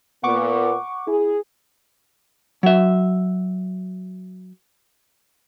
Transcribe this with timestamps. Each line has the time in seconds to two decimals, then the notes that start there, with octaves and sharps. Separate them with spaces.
0.23 A#2 B3 F#5 C#6 D6
1.07 E4 G#4
2.63 F#3 E5